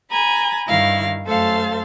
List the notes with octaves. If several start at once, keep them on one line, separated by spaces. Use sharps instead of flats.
G#5 A#5 B5
G2 D#3 G3 E4 F5 A#6
F#2 A3 A4 C5 F5 A6